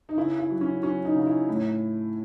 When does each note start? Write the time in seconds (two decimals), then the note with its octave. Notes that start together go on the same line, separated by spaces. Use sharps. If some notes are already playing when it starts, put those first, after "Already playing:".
0.09 D#4
0.17 C#3 E4
0.39 E4
0.50 F#3
0.61 C#4
0.83 F#3 C#4
1.05 D#4
1.15 C#3
1.26 E4
1.49 A2